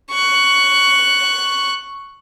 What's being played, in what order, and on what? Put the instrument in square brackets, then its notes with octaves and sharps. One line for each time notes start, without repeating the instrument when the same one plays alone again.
[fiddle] C#6 F#6